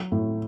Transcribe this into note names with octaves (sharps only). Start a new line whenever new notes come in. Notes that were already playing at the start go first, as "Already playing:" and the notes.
Already playing: F#3
A2